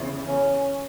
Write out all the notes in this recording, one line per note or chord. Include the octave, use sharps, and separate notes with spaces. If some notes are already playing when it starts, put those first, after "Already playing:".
Already playing: E2 C#3 E3
C#4